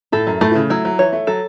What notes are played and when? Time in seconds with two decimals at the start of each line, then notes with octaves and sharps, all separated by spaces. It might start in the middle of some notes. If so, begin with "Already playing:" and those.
0.12 A2 A4
0.27 F#2
0.41 A2 A3
0.52 E3
0.55 C#3
0.70 F#3 E4
0.85 F#3
0.99 E3 C#5
1.13 A3
1.27 F#3 A4